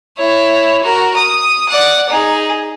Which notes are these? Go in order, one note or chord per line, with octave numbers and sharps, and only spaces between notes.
E4 C#5
F#4 A#4
D#6
D5 F#5
D#4 G#4